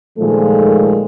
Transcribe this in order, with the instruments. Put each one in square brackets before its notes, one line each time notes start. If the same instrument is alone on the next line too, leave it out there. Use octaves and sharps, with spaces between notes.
[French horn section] A#2 D#3 F3 G#3 A3 A4